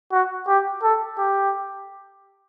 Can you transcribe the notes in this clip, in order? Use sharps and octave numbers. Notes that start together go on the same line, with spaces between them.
F#4
G4
A4
G4